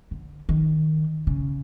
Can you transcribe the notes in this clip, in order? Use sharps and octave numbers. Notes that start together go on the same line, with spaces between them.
D3
D#3
C#3